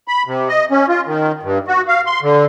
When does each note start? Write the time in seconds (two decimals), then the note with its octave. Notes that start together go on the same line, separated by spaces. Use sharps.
0.08 B5
0.27 C3
0.49 D#5
0.71 C#4
0.89 F4
1.07 D#3
1.43 G2
1.68 F#4
1.88 F5
2.06 C6
2.22 D3